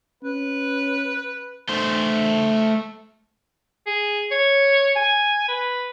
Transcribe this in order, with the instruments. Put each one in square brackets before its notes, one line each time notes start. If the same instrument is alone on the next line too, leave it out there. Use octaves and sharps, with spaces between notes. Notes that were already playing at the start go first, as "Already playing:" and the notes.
[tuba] C#4 [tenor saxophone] B4
[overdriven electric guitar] A3 C5
[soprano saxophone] G#4
C#5
G#5
B4